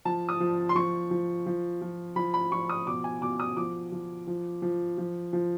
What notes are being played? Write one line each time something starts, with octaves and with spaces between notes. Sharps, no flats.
F3 A5
D#6
F3
C6
F3 C#6
F3
F3
F3
F3 B5
B5
F3 C#6
D#6
B2 D6
G#5
B2 D6
D#6
F3 D6
F3
F3
F3
F3
F3